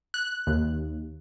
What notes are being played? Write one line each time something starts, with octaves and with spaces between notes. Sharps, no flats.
F#6
D#2